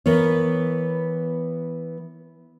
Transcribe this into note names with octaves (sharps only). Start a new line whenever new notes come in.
E3 B3 A#4 C#5